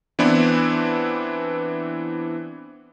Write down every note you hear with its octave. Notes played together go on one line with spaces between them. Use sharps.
E3 B3 C4 D4 E4